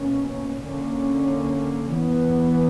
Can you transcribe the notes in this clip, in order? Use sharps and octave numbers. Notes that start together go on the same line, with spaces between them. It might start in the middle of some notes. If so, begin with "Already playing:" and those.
Already playing: B2 A#3 C#4
D3 A#3 C#4
E3 B3